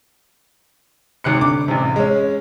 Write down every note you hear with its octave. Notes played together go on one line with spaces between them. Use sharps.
G#1 C3 F#6 C#7
D3 D6
A1 C3
G#3 C#4